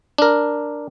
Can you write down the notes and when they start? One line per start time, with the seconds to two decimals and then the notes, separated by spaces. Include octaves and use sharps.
0.18 D4 A#4